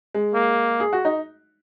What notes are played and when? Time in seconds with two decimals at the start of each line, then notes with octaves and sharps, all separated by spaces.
0.14 G#3
0.35 A#3
0.80 G#4
0.93 F#4
1.05 D#4